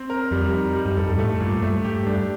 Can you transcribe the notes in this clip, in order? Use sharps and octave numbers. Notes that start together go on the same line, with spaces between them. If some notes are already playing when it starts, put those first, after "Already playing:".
Already playing: C4
A#4
F2 G3
D#4
G3
G2
F2 A4
G2
A2 A3
G2 A#2
G2 A3
G4
G2 D4